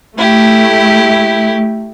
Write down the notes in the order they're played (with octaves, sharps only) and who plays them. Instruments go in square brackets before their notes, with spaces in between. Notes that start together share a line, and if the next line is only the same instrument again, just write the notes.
[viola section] A3 [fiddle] E4 G4